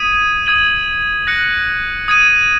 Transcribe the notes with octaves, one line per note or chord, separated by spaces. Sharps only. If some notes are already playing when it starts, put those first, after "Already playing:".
Already playing: D#6 G#6 B6 D#7
D#6 G#6 D#7 F#7
F#6 A#6 C#7 F#7
D#6 G#6 D#7